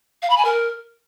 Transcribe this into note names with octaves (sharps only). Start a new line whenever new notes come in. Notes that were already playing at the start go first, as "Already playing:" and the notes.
F5
B5
G#5
A#4